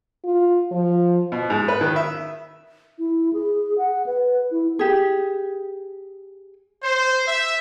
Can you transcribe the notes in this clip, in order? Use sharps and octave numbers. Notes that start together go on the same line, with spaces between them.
F4
F3
B2
G#2
B4
D#3
E5
E4
G#4
F#5
B4
E4
G4 G#4
C5
E5